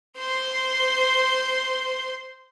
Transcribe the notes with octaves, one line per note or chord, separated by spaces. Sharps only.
C5 C6